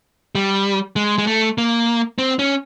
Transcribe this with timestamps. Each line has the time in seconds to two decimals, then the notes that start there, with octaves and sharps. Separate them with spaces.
0.35 G3
0.96 G#3
1.18 G#3
1.27 A3
1.58 A#3
2.18 C4
2.39 C#4